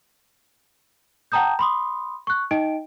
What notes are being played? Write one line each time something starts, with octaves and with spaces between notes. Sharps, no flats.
F#5 G5 A5 A#5 D#6 G6
B5 C6 D#6
C#6 F#6
D#4 D#5 G5 D7